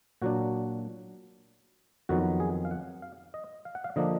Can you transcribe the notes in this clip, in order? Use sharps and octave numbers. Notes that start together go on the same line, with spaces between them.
A#2 F#3 D4 F#4
F2 D#3 F#3 B3 F#4
G#4
F5
F#5
F5
D#5
F5
F#5
F5
D3 F3 A#3 D4 D#5